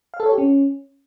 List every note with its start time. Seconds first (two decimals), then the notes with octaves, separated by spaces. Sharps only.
0.14 F5
0.20 A4
0.26 C#5
0.32 G4
0.38 C#4